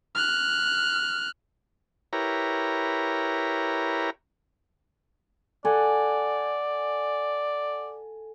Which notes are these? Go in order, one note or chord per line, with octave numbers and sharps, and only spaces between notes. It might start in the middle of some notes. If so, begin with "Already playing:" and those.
F6 F#6
E4 G4 A#4 B4 C#5 A#5
A4 D5 F#5 G#5